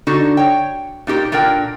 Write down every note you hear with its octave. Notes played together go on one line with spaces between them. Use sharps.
D3 D#4 F#4
C#5 G5
A#2 D#4 G4 A#4
A#2 A#3 D4 A#4 G5